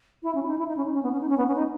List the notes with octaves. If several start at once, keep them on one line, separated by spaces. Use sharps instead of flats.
E4
C#4
E4
D#4
E4
D#4
C#4
D#4
C#4
B3
C#4
D#4
C#4
B3
C#4
D#4